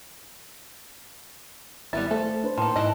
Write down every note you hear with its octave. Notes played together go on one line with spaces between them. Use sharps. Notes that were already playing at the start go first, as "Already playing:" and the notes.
G#1 G3 B3 E4 A6
A3 A4 C5
D4 B4 C5
A2 D#3 A#3 A5 C6
G#2 E3 E4 D#5